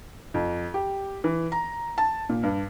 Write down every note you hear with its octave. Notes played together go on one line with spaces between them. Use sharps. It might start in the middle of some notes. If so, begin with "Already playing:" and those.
F2
G4
E3
A#5
A5
A#2
G2